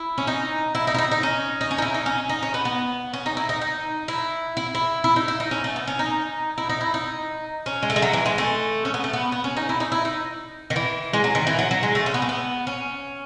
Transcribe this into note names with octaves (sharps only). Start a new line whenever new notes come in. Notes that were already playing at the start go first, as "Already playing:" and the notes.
Already playing: E4
C#4
D#4
E4
D#4
E4
D#4
D#4
C#4
D#4
C#4
D#4
E4
D#4
C#4
D#4
C#4
B3
B3
C#4
D#4
E4
D#4
D#4
E4
E4
E4
E4
D#4
E4
D#4
C#4
A3
B3
C#4
D#4
E4
D#4
E4
D#4
C#4
G#3
A3
G#3
F#3
E3
G#3
A3
C#4
B3
A3
B3
B3
C#4
D#4
E4
D#4
E4
D#4
D#3
E3
G#3
F#3
D#3
E3
F#3
F#3
G#3
A3
C#4
B3
A3
B3
C#4